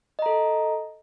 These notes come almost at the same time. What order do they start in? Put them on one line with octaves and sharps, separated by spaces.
D#5 A#5 A4